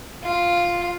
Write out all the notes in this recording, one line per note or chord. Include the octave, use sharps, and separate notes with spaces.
F4